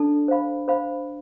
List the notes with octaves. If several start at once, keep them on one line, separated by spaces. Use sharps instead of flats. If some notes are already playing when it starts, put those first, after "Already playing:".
Already playing: D4 A4 D5 A5
C5 F5 B5
C5 F5 B5